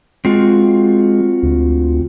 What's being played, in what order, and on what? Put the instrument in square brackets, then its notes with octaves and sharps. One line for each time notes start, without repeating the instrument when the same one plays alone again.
[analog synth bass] G#3 [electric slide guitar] C4 F4 F#4
[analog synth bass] D2